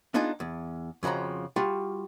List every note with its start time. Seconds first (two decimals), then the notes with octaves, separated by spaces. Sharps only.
0.14 B3 D4 D#4 F4 G#4
0.40 E2
1.03 F2 C#3 F3 F#4 A#5
1.56 G3 F4 F#4